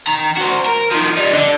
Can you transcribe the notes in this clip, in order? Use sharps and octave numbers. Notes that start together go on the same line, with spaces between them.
D#3 A#5
F#4 C5
A#4
D#3 F3
G3 D#4
D3 D4